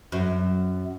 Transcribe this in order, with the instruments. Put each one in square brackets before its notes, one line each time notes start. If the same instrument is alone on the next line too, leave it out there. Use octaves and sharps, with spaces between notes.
[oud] F#2